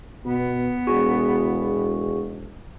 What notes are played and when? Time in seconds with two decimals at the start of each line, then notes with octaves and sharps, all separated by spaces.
0.25 B2 B3
0.87 E1 F#4 G#4